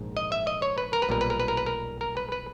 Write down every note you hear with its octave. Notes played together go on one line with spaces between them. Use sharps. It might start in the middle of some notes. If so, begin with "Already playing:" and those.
Already playing: A#1 G#2
D#5
E5
D#5
C#5
B4
A#4
B4
B1 A#2 G3 A#4
B4
A#4
B4
A#4
B4
A#4
A#4
B4
B4